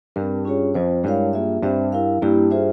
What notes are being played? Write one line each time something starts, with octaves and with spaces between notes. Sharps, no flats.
G2 C4 G4 A#4
C#4 F4 G#4 C#5
F2 C4 F4 C5
G2 G#3 E4 A#4 C#5 F5
A#3 F4 G#4 E5
G2 C4 G4 C5 E5
E4 A#4 F5
G2 A#3 E4 G4
F4 G#4 C5 E5